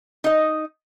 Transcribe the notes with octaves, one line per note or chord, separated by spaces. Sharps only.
D#4 D#5